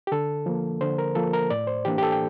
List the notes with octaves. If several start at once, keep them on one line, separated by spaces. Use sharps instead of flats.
G4
D3 A4
F3 A#3
D3 C5
A#4
F3 A#3 A4
A#4
A2 D5
C5
E3 A#3 D4 G4
G4
A4
G5